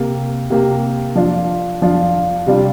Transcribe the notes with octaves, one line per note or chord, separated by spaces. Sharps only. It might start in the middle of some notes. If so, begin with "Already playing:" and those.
Already playing: C3 A#3 G4
C3 A#3 G4
F3 D4 F4
F3 D4 F4
C3 G3 D4 F4